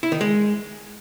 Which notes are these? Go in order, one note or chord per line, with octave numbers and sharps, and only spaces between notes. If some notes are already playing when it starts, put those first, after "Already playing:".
E4
D#3
G#3